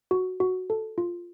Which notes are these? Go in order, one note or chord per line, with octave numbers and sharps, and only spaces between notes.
F#4
F#4
A4
F4